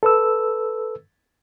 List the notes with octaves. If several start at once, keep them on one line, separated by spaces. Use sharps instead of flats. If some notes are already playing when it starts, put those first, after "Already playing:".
A4 B4 E6